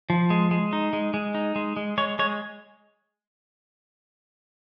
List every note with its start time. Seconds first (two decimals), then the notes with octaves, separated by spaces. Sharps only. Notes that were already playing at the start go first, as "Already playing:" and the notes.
0.10 F3
0.30 G#3
0.51 G#3
0.73 D#4
0.93 G#3
1.14 G#3
1.35 D#4
1.56 G#3
1.77 G#3
1.98 G#3 C#5
2.19 G#3 C#5